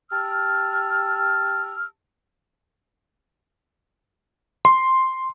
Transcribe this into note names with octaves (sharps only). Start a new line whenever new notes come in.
G4 A5 E6 F6
C6